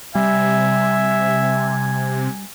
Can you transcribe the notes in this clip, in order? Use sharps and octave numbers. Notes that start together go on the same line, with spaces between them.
C3 G3 E5 G#5